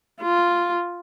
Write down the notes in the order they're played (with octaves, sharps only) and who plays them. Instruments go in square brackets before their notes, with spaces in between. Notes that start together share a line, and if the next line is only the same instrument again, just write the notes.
[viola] F4